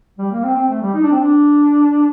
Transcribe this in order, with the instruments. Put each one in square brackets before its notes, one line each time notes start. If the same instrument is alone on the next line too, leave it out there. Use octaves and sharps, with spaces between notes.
[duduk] G3
A#3
C4
C4
A3
G3
D#4
D4
C4
D4